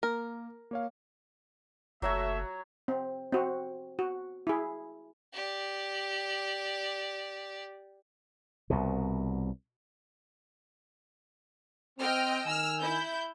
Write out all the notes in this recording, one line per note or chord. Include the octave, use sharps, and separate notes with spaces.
A#3 A#4
A#3 C#5 F5
F#1 F#3 A3 F#4 C#5 E5
C4
C4 F#4
F#4
E4 G#4
G4 D5
C2 B2
C4 D#5 G5 F6
D#3 G#5 E6 F6
E4 G6